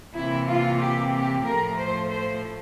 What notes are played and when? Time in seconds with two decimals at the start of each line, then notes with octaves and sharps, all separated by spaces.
0.15 C3 E3 A#3 E4
0.47 F4
0.80 G4
1.12 G4
1.44 A2 F3 A3 A#4
1.76 C5
2.09 C5